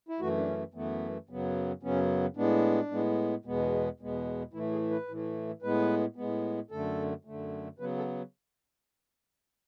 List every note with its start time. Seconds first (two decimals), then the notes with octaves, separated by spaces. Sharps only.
0.09 E4
0.20 F#2 E3 A3 F#4
0.37 D4
0.47 C#4
0.74 F#2 E3 A3 B3
1.29 F#2 C#3 F#3 B3
1.83 F#2 C#3 F#3 B3 C#4
2.36 A2 G#3 B3 D4
2.91 A2 G#3 B3
3.45 E2 B2 G#3 B3
4.00 E2 B2 G#3 B3
4.53 A2 E3 A3 E4
4.72 G#4
4.91 B4
5.08 A2 E3 A3
5.62 A2 G#3 B3 B4
6.16 A2 G#3 B3
6.71 F#2 D3 A3 A4
7.25 F#2 D3 A3
7.78 C#3 F#3 B3 B4
7.97 A4